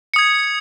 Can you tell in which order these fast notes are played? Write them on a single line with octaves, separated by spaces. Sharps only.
C#7 D#6 G#6